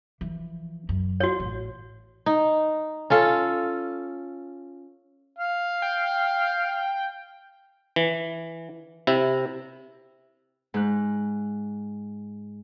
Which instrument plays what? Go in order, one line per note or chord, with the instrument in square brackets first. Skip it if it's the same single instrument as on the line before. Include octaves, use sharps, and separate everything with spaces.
[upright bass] E3 F3
F#2
[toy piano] F#4 C#5
[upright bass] A1
[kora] D#4
C#4 F4 A4
[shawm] F5
[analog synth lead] G5
[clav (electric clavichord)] E3
C3 E4
[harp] G#2 F#6